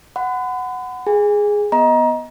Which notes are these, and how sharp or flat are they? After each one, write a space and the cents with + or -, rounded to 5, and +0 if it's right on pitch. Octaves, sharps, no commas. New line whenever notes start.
F#5 +0 B5 +40
G#4 +0 G#5 -30
B3 -5 D#5 +15 A#5 +25